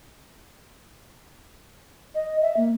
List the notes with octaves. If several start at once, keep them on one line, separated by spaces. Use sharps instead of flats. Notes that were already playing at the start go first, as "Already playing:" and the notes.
D#5
E5
A#3